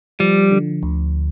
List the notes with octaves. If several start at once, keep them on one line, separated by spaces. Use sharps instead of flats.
F3 G3
D3
D2